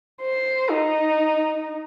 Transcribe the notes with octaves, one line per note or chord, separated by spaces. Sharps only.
C5
D#4